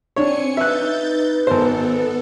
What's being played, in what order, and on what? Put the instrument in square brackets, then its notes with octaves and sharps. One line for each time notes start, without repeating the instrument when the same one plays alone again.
[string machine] C4 G#5 C#7 [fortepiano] D4 C#5
[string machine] D#4 G6 A6 [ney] B4 [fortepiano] E5 F#6
[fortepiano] G#1 C5 [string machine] B3 A4